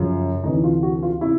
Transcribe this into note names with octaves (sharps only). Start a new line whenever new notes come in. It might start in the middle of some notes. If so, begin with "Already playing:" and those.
Already playing: F#2 C#3 F3
D2 C3 E3 D#4
F4
F#4
F4
C3 E4